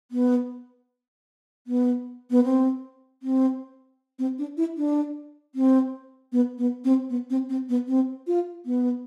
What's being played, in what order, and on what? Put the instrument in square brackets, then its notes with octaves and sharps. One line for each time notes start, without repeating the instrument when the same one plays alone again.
[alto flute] B3
B3
B3
C4
C4
C4
D4
E4
D4
C4
B3
B3
C4
B3
C4
C4
B3
C4
F4
B3